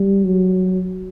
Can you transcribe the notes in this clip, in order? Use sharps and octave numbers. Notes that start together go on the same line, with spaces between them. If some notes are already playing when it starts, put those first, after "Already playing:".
Already playing: G3
F#3